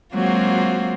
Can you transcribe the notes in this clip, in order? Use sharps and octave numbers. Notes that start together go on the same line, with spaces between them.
F#3 G#3 A#3 C4 F4 F#4